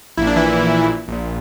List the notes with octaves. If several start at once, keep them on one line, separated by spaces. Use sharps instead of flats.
A#1 A#2 E4
D4
E3 E4
A#1 A#2